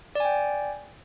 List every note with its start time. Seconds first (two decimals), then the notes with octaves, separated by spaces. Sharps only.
0.15 D5
0.20 G#5
0.25 G5